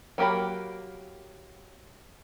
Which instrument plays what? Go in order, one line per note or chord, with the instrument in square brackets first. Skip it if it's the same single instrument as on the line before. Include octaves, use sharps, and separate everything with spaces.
[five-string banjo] F#3 A#3 G4 A#4 B5